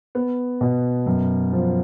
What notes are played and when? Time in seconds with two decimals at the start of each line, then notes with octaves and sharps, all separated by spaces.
0.15 B3
0.61 B2
1.06 F#2
1.53 F3